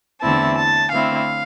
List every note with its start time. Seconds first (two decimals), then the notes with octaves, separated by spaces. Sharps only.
0.21 E2 D3 A3 C4 E4 A5
0.57 A5
0.91 D3 A3 C4 E4 F5